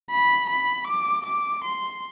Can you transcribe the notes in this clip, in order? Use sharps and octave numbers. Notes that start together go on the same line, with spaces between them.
B5
B5
D6
D6
C6